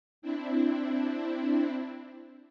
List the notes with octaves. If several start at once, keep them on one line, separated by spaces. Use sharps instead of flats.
C4 D4 E4